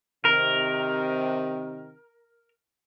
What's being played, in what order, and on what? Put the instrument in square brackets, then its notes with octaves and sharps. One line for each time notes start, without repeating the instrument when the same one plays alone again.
[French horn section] C3 D#3 [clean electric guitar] A#4